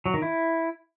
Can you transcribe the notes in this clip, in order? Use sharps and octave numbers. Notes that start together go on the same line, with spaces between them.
F#3
D#3
E4